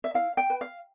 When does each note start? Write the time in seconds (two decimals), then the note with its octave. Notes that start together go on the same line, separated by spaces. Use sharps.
0.04 E5
0.14 E4 F5
0.37 G5
0.50 B4
0.61 F5